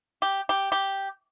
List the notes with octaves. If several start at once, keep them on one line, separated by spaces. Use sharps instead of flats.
G4
G4
G4